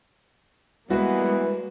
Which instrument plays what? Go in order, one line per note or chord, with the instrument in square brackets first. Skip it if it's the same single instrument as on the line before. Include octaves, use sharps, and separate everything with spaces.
[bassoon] E3 [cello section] G3 G#3 A#3 [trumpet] B3 [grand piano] F#4 B4